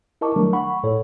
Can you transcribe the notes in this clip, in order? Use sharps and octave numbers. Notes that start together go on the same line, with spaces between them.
E4 A#4 D#5 A5 C#6 D6
D#3 F#3 G3 A3 D4 A#4
F#5 B5 C#6
A2 A4 C#5